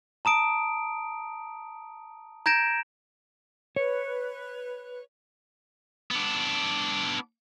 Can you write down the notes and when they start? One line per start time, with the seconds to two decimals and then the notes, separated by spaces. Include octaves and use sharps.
0.25 A5 A#5 D#6 D7
2.46 A#5 G6 G#6 A#6 D7 E7
3.76 B4 C#5
6.11 B3 D4